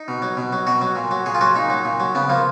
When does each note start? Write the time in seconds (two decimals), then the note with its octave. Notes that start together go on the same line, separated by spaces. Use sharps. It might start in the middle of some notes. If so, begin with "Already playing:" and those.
Already playing: D#4
0.08 B2
0.22 F#3
0.37 B2
0.53 F#3
0.67 B2 F#4
0.81 F#3
0.96 A#2
1.11 F#3
1.26 A#2 G#4
1.35 F4
1.41 F#3 F#4
1.56 A#2 D#4
1.70 F#3
1.85 A#2
2.00 F#3
2.15 C#3 B3
2.29 F3 A#3